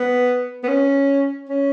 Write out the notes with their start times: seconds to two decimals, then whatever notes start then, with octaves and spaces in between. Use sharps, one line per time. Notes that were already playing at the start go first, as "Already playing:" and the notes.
Already playing: B3
0.64 B3
0.68 C#4
1.49 C#4